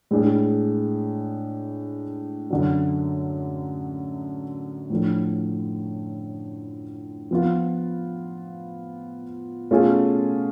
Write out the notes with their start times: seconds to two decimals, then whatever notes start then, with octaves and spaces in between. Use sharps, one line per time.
0.11 A2 G#3 D4 G#4
2.50 F#2 D3 F#3
4.90 A2 F3 A3 D4
7.31 F3 B3 F4
9.71 B2 A3 C#4 F4 G#4